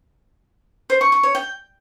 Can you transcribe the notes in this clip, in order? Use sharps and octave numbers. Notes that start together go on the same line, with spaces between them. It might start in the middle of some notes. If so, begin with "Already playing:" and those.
C5
C#6
C#6
C#5
G5